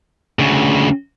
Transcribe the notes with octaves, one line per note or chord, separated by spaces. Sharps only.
D2 C#3